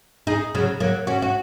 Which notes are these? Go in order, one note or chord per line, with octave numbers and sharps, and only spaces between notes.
D#4 G#4
C#3 F#3
F#3 A#3
C#4 F#4
F#4